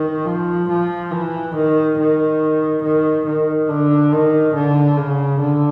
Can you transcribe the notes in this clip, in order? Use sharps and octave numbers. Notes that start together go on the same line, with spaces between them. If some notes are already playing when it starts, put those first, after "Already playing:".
Already playing: D#3
F3
F3
E3
D#3
D#3
D#3
D#3
D3
D#3
D3
C#3
D3